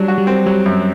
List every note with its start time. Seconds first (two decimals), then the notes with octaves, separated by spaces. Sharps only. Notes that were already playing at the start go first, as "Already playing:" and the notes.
Already playing: F#3 G3 D4
0.08 F#4
0.18 G3
0.27 C4
0.46 F#3 G3
0.66 F#2